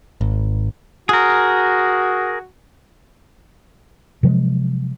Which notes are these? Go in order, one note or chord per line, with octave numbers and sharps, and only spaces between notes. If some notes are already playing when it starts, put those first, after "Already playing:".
G#1
F#4 G#4 A#4
C3 F3 F#3 G#3